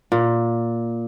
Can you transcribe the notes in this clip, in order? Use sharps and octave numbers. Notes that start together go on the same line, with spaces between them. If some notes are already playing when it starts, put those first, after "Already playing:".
A#2